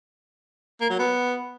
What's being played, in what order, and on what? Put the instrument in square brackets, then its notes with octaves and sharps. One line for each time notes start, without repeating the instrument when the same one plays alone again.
[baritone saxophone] A#3
F#3
B3